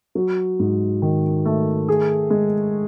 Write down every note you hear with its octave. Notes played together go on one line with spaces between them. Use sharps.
F#3
G#2
D#3
A3
G#4
G#3